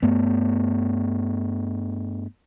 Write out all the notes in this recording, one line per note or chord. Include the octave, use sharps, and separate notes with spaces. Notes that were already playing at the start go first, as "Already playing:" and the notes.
G2 A3 B3